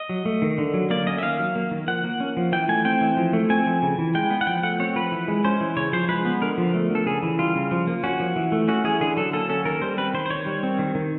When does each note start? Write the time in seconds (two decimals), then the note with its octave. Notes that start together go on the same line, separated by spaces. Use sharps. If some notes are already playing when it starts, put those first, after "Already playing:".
Already playing: D#5
0.09 F#3
0.25 A3
0.42 D#3
0.58 D3
0.74 F#3
0.90 A#3 D5
1.07 C#4 D#5
1.18 E5
1.23 D#3 F5
1.39 F#3
1.55 A#3
1.71 D#3
1.88 F3 F#5
2.04 A#3
2.20 C#4
2.37 F3
2.52 E3 G5
2.69 A3 G#5
2.85 C4 G5
3.01 E3
3.17 F3
3.33 A3
3.50 C4 G#5
3.67 F3
3.82 C#3
3.99 E3
4.15 G#3 G5
4.30 B3
4.41 F#5
4.47 F3 G5
4.63 A3 F#5
4.79 C4 C#5
4.96 F3 B4
5.12 E3
5.28 G#3
5.44 C#4 C5
5.61 E3
5.77 C#3 C#5
5.93 F3 C5
6.09 G#3 B4
6.25 B3
6.41 D3 A#4
6.58 F3
6.74 A3
6.90 D3 A4
7.06 C#3 G#4
7.23 E3
7.39 G3 F4
7.55 C#3
7.71 F3
7.87 A#3
8.03 C#4 F#4
8.20 F3
8.36 E3
8.52 A3
8.68 C#4 F#4
8.84 E3 G#4
9.01 D3 G#4
9.17 F#3 A4
9.33 A#3 A4
9.49 C#4 A4
9.65 D#3 A#4
9.82 G3 C5
9.98 C4 B4
10.14 D#3 C5
10.26 C5
10.30 D#3 C#5
10.46 G3
10.63 C4
10.79 D#3
10.95 D#3